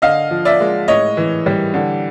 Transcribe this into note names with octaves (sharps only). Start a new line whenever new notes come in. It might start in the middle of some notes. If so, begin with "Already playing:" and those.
D3 D#5 F5
F3
D5 E5
G#3
A2 C#5 D#5
E3
G3
D3